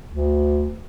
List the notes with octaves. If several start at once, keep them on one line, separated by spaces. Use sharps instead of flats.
D2